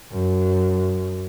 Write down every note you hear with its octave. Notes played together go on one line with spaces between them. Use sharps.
F#2